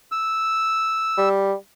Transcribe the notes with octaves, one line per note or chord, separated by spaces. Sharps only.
E6
G3